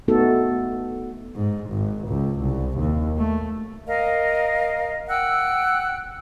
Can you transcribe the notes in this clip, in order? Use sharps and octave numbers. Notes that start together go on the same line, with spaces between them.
A3 B3 D#4 F#4 A4
G#2
G#1
C#2
C2
D#2
A3
A#4 D#5 F5
F#5 G5 E6 F#6